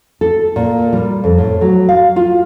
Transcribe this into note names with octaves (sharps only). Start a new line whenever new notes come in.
A4
A#2
G3
F2
A2
F#3
F5
F4